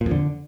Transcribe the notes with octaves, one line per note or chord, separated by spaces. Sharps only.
A#2
F2
D3